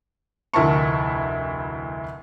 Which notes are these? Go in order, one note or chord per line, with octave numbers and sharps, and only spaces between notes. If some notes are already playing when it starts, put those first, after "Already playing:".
F1 D2 E4 A#4 A5 C#6